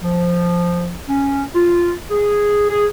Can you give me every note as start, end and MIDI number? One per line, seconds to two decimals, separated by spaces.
0.03 0.94 53
1.08 1.44 61
1.55 1.93 65
2.11 2.65 68
2.70 2.86 68